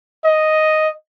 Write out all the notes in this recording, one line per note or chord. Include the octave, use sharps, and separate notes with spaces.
D#5